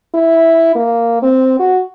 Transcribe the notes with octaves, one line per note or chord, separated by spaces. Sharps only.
E4
A#3
C4
F#4